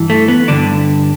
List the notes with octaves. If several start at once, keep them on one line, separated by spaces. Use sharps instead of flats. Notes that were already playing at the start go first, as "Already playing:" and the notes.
Already playing: G2 E3
A3
B3
G2 D3 D4